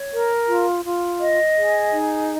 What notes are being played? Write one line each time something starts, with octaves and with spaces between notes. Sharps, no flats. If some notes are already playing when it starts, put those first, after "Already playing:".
Already playing: C#5
A#4
F4
F4
D#5
G#4
D#4